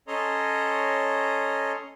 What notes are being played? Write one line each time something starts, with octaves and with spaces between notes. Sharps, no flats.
C#4 A4 C#5 D#5 A#5 C6